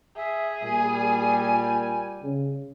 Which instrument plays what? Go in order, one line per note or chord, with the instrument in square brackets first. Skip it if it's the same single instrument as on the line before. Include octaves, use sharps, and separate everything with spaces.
[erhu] G#4 [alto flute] E5
[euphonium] A#2 [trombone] G3 [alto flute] G#5
[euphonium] C#3